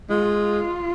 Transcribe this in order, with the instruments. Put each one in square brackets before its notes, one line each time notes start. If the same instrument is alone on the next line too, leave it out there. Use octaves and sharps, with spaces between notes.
[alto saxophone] G#3 [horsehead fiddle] F4